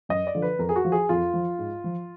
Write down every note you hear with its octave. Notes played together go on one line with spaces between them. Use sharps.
F#2 D#5
D5
D3 F3
B4
F2 A#4
G#4
F#4
F3
G#4
F2 F4
F3
G#2
F3